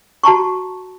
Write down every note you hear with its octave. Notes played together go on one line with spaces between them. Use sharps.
F#4 A5 A#5 C#6